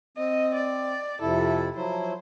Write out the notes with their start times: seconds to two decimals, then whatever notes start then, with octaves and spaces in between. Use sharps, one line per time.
0.17 C4 D#5
0.55 D5
1.21 F2 C3 E4 A4
1.75 F3 F#3 E4 C5